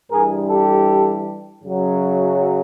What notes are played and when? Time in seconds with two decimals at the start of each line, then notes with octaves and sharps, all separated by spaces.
0.11 G2 E3 G3 G#4 A#4
0.48 G4 A4
1.64 F#2 C#3 F#3